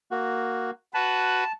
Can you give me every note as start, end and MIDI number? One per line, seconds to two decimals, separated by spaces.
0.11 0.71 58
0.11 0.71 66
0.94 1.44 66
0.94 1.44 71
0.94 1.52 81